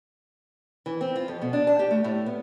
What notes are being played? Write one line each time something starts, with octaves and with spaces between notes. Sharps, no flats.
E3
C4
F4
F2
B2
D4
A5
G4
A3
A2
B3